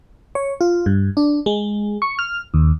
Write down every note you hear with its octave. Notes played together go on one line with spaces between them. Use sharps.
C#5
F4
G2
D4
G#3
C#6
F6
D#2